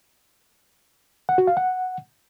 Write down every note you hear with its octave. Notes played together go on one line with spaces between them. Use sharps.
F#5
F#4
F5
F#5